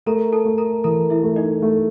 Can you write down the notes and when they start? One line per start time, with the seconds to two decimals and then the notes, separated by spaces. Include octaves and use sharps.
0.06 A3 A#4 A#5
0.32 A4 A5
0.45 A3
0.58 A#4 A#5
0.84 E3 A#4 A#5
1.10 E4 E5
1.23 A3
1.36 D#4 D#5
1.62 A3